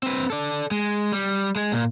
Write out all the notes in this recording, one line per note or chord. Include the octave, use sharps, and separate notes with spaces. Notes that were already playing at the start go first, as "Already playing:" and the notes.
C4 B4
A4 D5
G#3
G3
G#3 G#4
A#2